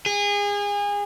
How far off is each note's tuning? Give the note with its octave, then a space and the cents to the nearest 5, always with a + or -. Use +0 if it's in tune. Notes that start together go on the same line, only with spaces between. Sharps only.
G#4 -30